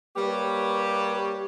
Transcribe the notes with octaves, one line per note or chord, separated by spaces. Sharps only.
G3 A#3 G4 B4 C#5